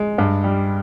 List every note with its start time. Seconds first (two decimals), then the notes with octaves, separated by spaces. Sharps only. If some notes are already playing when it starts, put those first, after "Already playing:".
Already playing: G#3
0.18 G2
0.44 G3